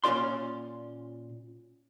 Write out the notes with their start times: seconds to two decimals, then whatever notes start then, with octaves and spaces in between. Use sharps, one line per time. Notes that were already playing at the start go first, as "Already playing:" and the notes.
0.04 A#2 C#4 F4 D5 C6